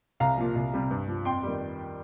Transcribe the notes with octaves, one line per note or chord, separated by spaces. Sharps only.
C2 F5 A#5
A#2 F3
C2
C3 G3
G2
F3
F2 G5 C6
D#3 G3